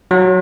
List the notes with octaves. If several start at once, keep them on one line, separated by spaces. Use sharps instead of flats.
F#3